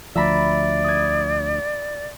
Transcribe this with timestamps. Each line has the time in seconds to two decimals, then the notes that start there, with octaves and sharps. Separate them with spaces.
0.16 D2 F3 D5 E5 A#5 B5
0.84 D#6 G#6